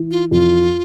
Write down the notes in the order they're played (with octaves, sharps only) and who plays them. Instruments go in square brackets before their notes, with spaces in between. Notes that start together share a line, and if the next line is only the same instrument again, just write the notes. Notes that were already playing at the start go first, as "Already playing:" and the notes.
Already playing: [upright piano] E3
[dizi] F4
[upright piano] F2 [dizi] F4